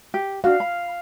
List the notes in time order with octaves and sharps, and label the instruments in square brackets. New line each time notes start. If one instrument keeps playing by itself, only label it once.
[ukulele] G4
[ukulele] D4 F#4 [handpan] F5
[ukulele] B5